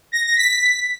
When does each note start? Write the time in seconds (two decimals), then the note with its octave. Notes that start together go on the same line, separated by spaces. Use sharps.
0.12 A#6
0.26 A#6
0.36 B6